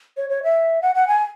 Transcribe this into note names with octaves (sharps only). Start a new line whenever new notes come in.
C#5
C#5
E5
F#5
F#5
G#5